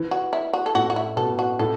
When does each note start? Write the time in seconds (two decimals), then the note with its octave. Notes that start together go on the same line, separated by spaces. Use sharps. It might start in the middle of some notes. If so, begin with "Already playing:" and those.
Already playing: E3
0.11 F#4
0.33 E4
0.53 F#4
0.66 A4
0.75 A2 A3 F#4
0.90 F#4
0.96 E4
1.17 B2 B3 A4
1.39 F#4
1.59 A2 A3 A4